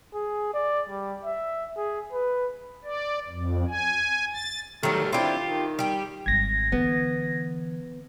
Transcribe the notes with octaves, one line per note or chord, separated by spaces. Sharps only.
G#4
D5
G3
E5
G#4
B4
D5
F2
G#5
A6
D#3 F#3 G3 A3 F6
C4 D4 E4 F4 G4
D#3
G3 G4
G#1 G3 G#6 A#6
D3 E3 B3